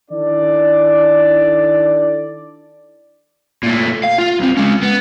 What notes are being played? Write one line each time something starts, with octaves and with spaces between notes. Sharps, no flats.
D#3 D4 E4 A4 D5
A#2 A3
F5
F4
B1 C4
G#3 C#4
B3